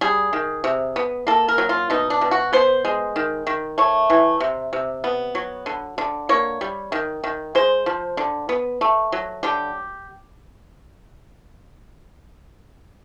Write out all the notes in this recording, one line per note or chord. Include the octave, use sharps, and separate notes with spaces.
G3 G#4
D#3
C3
B3
A#3 A4
A#4
F#3
F4
B2 D#4
D4
B2
F#4
B3 C5
G#3
D#3
D#3
A3 C#5
E3
C3
C3
B3
F#3
D3
D3
A#3 C#5
G3
D#3
D#3
G#3 C5
F3
D3
B3
A3
F#3
D3 G4